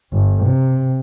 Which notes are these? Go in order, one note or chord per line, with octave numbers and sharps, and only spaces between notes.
G1
C3